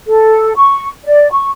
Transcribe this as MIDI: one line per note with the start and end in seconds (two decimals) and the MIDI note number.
0.08 0.53 69
0.56 0.89 85
1.05 1.31 74
1.32 1.50 85